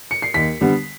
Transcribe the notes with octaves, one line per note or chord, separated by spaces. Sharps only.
C#7
C7
D#2 B6
D3 G3 B3